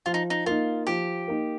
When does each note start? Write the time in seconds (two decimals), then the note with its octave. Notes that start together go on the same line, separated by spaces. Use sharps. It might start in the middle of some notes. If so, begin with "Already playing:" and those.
0.06 F3 F4
0.14 D#4
0.30 D#4
0.46 A#3 D#4 F4
0.87 F3 G4
1.28 A#3 D#4